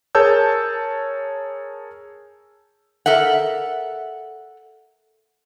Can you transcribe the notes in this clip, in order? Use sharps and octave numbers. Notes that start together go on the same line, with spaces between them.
G#4 A#4 C#5 A5 E6 G6
A4 A#4 E5 F#5